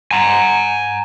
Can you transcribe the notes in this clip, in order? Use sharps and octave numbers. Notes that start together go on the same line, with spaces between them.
G#5 A#5